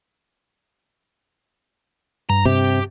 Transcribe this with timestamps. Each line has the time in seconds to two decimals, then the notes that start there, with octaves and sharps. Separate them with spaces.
2.30 G2 A#5
2.46 C3 G4